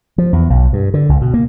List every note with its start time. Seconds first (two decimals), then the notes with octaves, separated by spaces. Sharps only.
0.18 F3
0.33 E2
0.50 B1
0.73 G2
0.94 D3
1.09 C#2
1.21 B2
1.34 A#3